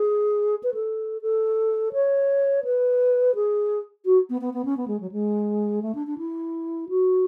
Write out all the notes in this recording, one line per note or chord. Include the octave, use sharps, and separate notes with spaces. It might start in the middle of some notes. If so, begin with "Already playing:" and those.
Already playing: G#4
B4
A4
A4
C#5
B4
G#4
F#4
B3
B3
B3
C#4
B3
G#3
F#3
G#3
A3
D4
D4
E4
F#4